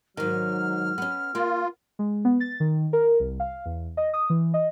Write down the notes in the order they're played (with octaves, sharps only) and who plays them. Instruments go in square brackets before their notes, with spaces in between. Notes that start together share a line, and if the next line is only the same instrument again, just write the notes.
[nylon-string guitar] G#2 D#3 [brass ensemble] F#3 [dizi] F6
[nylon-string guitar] B3 C#4
[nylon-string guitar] A#3 [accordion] F4
[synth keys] G#3
B3
A6
D#3
A#4
C2
F5
E2
D#5
D#6
E3
D#5